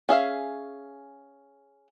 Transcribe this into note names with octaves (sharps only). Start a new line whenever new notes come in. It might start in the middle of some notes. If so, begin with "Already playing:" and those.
C#4 G#4 E5 F5